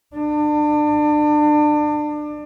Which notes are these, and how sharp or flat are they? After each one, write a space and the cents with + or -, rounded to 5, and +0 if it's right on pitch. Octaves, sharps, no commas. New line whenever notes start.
D4 +30